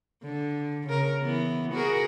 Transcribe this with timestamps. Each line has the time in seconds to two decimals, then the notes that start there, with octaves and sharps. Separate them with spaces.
0.24 D3
0.87 C#3 A#4
1.21 E3 B3
1.73 F#4 G#4 A#4